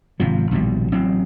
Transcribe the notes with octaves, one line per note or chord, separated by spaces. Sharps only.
G#1 C3 F3
A#1 D#2 B2 G3
A1 F#3 C4